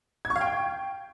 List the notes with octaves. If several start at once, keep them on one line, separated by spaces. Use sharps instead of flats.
G#6
C#6
F5
G5